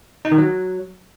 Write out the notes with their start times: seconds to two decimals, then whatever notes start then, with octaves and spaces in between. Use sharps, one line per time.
0.25 D#4
0.31 D#3
0.38 F#3